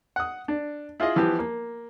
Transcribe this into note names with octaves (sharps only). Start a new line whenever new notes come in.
F#5 D#6
D4
E4 F4 G#4 D#5
E3 F3 B3 G4
A#3